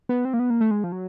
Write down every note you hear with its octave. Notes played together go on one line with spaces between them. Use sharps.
B3
C4
A#3
B3
A#3
A3
G#3
F3
F#3